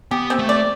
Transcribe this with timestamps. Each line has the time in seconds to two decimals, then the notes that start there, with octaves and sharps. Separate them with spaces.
0.11 B3 G4
0.30 C4
0.39 A3
0.49 D5